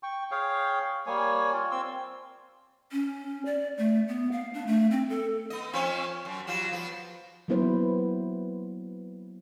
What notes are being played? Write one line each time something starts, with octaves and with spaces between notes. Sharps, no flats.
G5 C#6
G#4 C#5 F5 G5
G3 A#3 C#5 G#5
F4 D5
C4 C6 E6
C#4
D5
A3
B3
F5
D4
A3
C4
A4
B3 D#5
F3 C4 C#4
F#2
F#3 G3 F4
F3 B3
F#3 A#3 B3 E4 B4 C5